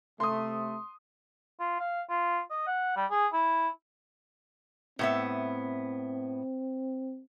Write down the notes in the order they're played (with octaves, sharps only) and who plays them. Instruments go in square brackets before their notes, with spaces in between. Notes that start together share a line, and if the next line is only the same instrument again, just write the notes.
[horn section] C3 A3 [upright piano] C6 D#6
[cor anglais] F4
F5
F4
D#5
F#5
G3
G#4
E4
[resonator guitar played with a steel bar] A2 B3 E5 [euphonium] C4